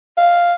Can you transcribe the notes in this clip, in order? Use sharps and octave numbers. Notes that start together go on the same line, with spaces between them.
F5